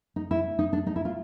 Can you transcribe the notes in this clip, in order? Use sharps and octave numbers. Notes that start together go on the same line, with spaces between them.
D#4
E4
D#4
D4
D#4
E4
F4